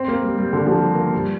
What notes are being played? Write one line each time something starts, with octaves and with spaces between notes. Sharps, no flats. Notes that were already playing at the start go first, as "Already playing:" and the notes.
Already playing: C4
A#3
G3
G3
D3
F3
G3
A#3
G3